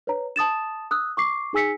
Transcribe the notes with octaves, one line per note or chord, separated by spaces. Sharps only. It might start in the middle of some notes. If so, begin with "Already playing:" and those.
B4 C#5 A#5
A5 D#6 A6 E7
D#6 E6 F#6
C#6 D6 C7
D#4 G#4 G#5 E6 B6 C#7